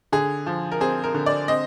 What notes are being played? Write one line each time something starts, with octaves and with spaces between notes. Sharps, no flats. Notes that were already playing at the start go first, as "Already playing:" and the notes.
D3 G#4
F3
A#4
C4 G#4
A#4
D3
D5
C4 D#5